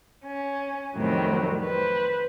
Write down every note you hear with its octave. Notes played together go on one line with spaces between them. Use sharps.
C#4
F2 A2 D#3 F#3 G3 C4
B4 C5